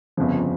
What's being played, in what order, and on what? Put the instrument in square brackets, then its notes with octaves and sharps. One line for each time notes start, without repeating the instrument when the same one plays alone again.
[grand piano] G1 F2 C#3 F3